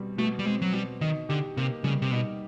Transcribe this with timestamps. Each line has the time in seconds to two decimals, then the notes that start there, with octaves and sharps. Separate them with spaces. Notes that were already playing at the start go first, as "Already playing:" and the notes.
Already playing: B2 G3 C4
0.18 B2 A3
0.39 G3
0.45 G#3 C4
0.62 F#3
0.73 B2 G3
1.01 D#3 D#4
1.29 D3 G4
1.57 C3 A#3
1.84 C#3 G3
2.02 C3
2.12 B2 D#4